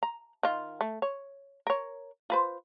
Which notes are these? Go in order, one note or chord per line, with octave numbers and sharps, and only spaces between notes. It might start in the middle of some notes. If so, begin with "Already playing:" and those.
A#5
D#3 F4
A3
C#5
A#4 C#5
F4 B4 C5